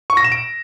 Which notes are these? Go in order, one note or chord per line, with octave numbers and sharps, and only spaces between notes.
C#6
A#6
E7
D7